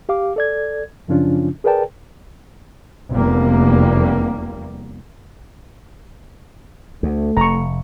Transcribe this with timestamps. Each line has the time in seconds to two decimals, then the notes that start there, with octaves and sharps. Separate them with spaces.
0.09 G4 F5 D6
0.36 A4 D5 G#6
1.08 F#2 C#3 F3 C#4 D4 F4
1.64 G#4 A#4 B4 D5 G5 A5
3.11 F1 E2 G3 A#3
7.03 D2 A3
7.37 F1 A#5 C#6